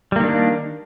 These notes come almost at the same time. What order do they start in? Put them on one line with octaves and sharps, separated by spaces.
G3 A#3 D#3 D4